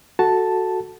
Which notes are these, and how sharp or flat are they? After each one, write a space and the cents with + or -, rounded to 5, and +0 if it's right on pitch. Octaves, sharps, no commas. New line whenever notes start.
F#4 +0 A4 +0 A5 +0